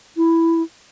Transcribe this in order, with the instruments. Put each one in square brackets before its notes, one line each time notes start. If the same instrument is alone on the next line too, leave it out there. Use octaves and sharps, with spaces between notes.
[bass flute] E4